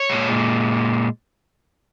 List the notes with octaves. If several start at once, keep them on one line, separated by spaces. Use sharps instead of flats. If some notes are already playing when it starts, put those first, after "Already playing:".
Already playing: C#5
A#2 G#3